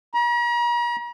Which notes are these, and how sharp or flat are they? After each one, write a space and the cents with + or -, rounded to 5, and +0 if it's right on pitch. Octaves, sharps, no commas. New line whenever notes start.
A#5 +40